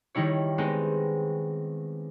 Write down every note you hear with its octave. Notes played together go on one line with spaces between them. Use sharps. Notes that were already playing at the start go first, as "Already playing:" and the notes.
D#3 G3 D#4 E4 C#5
G#3 B3 C4 D#4